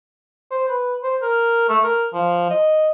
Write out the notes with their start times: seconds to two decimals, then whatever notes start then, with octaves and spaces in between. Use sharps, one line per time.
0.50 C5
0.68 B4
1.03 C5
1.22 A#4
1.69 A3
1.84 A#4
2.13 F3
2.50 D#5